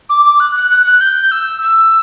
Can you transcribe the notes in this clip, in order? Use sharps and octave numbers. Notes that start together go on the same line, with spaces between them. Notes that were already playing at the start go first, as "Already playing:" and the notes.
D6
D6
F#6
F#6
F#6
F#6
G6
E6
E6